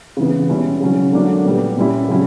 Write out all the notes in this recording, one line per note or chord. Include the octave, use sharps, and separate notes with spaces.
C#3 E3 B3
B2 G3 C#4 E4
C#3 F#3 C#4
D3 F#3 A#3 D4
A#2 G3 B3
A#2 G3 C#4 E4
C#3 F#3 C#4 E4